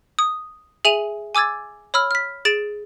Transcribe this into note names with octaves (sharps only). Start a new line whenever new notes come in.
D#6
G#4 E5 G#5 D#7 F7 F#7
G#5 D6 E6 G#6 A6
C#5 B5 E6 F6
F6 B6
G#4 A6 D7 E7